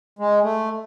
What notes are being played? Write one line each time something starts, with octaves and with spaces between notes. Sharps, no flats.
G#3
A3